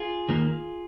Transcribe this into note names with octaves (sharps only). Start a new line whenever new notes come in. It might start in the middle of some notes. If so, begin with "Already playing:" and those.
Already playing: F4 G#4
D#2 D#3 A#3